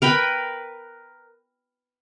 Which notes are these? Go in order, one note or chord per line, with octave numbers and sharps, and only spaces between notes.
A#4 B4 G5 B5